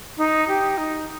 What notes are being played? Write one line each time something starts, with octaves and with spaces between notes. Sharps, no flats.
D#4
G4
D#4